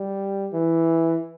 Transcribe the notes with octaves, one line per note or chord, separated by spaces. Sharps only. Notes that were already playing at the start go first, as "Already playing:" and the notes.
Already playing: G3
E3